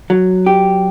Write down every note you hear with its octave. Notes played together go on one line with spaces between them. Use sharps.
F#3
G4